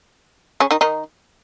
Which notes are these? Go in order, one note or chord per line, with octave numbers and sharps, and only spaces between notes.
C#3 C#4
D#3 D#4
D#3 D#4